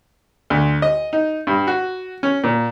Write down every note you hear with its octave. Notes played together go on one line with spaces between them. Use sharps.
D2
D#5
D#4
G2
F#4
C#4
A#2